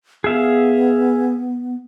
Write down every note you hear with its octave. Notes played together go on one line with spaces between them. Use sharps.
B3 G#4 E5 F5